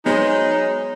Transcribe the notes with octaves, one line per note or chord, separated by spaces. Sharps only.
F#3 G#3 B3 D#4 G#4 C5